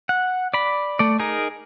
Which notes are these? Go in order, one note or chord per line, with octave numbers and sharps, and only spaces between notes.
F#5
D5 B5
A3 D5
D#4 G#4 A#4